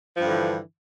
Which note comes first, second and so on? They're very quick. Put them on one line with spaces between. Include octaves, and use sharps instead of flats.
F3 G2 D3 E3